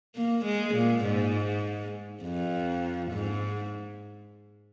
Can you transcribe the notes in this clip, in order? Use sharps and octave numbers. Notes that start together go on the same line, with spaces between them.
A#3
G#3
A#2
G#2
F2
G#2